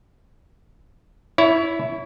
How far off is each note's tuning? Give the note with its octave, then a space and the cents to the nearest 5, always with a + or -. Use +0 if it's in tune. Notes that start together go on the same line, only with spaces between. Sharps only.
E4 +0 C#5 +30